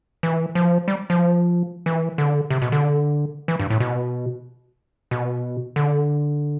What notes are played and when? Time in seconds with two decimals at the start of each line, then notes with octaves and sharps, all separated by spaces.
0.23 E3
0.55 F3
0.88 G3
1.10 F3
1.86 E3
2.18 D3
2.50 C3
2.62 B2
2.72 D3
3.48 E3
3.59 G2
3.70 A2
3.80 B2
5.11 B2
5.76 D3